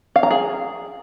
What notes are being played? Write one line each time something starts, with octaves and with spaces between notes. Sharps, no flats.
F5
A#5
G#4